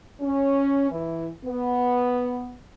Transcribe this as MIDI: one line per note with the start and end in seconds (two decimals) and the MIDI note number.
0.21 0.88 61
0.91 1.28 52
1.45 2.55 59